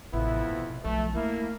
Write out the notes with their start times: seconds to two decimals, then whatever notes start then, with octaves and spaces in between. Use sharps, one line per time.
0.13 A1 F2 C3 B3 E4
0.51 B2
0.85 B1 F3 A3
1.15 A3 A#3 E4